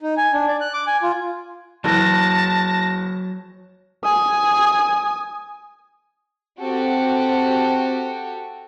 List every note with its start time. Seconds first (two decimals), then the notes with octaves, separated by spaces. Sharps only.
0.01 D#4
0.17 G#5
0.33 D4
0.47 D5
0.60 F#6
0.74 D6
0.87 G#5
1.03 F4
1.84 F#1 E3 F#3 A5 A#6
4.04 G#5 D#6
6.60 C4 F#4 G4 A4